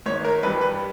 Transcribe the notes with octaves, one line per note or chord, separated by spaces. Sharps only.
G#1 C#5
A#4
G2 E3 G3 B4
B4